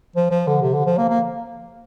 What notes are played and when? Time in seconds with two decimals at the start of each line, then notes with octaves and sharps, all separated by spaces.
0.16 F3
0.31 F3
0.47 D3
0.62 C3
0.74 D3
0.86 F3
0.98 A#3
1.09 A#3